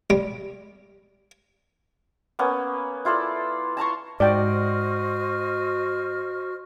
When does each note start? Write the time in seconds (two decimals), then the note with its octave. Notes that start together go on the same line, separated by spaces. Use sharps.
0.10 G3
2.39 A#3 B3 C#4
3.05 E4 F4 A4 D5
3.77 A5 A#5 C6 C#6
4.20 G#2 F#4 C5 D5 D#5 G5 F6